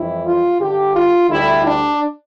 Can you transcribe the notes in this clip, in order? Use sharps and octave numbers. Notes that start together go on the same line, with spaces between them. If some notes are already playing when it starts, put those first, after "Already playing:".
Already playing: F2 E3 G3 E4
F4
G2 D3 G3 G4
F4
D2 D3 G3 E4
D4